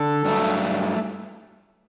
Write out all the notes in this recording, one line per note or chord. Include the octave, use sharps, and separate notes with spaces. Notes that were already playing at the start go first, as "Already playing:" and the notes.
Already playing: D3 A4
G2 F#3 A3